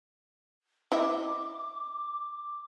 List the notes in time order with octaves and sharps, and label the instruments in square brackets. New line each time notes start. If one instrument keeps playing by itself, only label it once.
[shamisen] E4 D#5 E5 [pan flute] D6